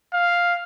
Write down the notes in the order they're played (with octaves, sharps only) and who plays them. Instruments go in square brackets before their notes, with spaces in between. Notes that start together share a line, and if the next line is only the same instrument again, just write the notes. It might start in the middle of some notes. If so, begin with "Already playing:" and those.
[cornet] F5